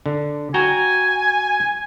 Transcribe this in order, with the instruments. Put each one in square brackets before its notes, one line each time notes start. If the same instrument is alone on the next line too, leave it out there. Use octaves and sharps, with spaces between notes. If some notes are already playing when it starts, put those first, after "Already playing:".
[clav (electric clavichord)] D3
[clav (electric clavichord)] F#4 G5 A#5 [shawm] G#5